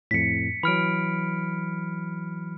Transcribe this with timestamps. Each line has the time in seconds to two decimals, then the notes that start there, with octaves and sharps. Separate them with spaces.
0.11 F2 A2 B6 C#7
0.63 E3 F#3 B5 F6 D7